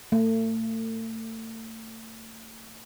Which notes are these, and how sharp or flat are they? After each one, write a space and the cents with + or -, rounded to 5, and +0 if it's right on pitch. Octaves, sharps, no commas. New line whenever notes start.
A3 +35